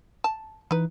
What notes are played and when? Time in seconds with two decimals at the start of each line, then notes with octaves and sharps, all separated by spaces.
0.24 A5
0.71 E3 D#4 B4